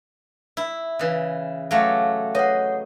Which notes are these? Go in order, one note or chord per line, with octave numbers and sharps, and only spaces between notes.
E4
C#3 E3
F#3 A3 F5 G#5 D6
B4 C#5 D#5 F#5 F#6